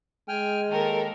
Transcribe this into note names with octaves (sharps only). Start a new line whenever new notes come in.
G#3 G5 G#5 F6
D#2 D#3 A4 A#4